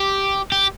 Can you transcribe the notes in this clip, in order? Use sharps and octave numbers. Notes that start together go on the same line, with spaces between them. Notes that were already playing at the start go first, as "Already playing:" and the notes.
Already playing: G4
G4